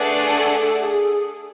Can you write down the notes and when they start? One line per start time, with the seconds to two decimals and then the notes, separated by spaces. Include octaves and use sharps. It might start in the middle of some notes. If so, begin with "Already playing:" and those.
Already playing: A3 D4 G#4 B4 D5 F#5
0.35 A4
0.80 G#4